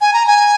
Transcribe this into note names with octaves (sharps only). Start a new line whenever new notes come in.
G#5
A#5
G#5